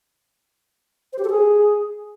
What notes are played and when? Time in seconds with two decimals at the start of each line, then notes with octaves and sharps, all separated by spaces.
1.13 C5
1.19 G4
1.24 A4
1.30 G#4